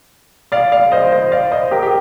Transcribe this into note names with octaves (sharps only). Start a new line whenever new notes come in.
D5 F5
D5 F5
C5 D#5
C5 D#5
D5 F5
C5 D#5
G4 A#4
G4